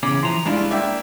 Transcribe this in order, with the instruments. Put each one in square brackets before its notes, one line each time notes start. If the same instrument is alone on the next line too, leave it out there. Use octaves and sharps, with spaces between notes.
[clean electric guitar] E2 C#3 C#4 [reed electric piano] D6
[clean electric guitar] E3 F3 A#5 [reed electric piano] C6
[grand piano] C2 D4 F4 [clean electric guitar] G#3 E4
[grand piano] A#3 D4 E5 [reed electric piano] D5 G5